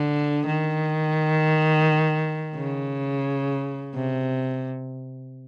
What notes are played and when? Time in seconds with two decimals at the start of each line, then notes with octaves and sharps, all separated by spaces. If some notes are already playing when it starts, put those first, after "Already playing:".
Already playing: D3
0.47 D#3
2.56 C#3
3.95 C3